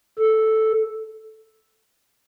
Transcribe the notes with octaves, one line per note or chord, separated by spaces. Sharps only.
A4